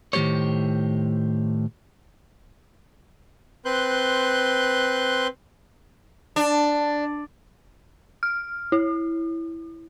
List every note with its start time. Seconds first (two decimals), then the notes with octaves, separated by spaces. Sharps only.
0.13 A2 D#3 A3 G4 C5 C#5
3.65 C4 B4 C6 F#6 G6
6.36 D4
8.23 F6
8.72 E4